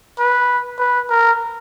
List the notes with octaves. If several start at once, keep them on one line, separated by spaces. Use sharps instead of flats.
B4
B4
A#4